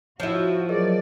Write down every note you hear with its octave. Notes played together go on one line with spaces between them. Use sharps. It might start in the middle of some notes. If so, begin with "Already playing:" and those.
F3 E4 F#4 C#5
F#3 G#4 A#4 D5 D#5